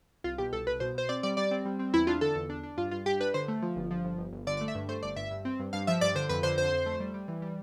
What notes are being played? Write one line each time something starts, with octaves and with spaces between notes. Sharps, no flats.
C2 F4
B2 G4
C2 A4
C2 B4
B2 C5
B2 C5
C4 D5
G3 D5
G3 D5
C4
G3
C4
E2 E4
D4 F4
D3 A4
E2
D4
D4
G2 F4
G2 F4
G2 G4
D4 B4
D3 C5
A3
F3
G1
F3
G1
G1
G1
D3 D5
D5
A3
E5
G2
A3 C5
G1 D5
G2 E5
G2
C4
G2
G2 F5
F3 E5
G2 D5
D3 C5
F2 B4
D3 C5
F2 C5
F2
A3
G3
G3
E3
G3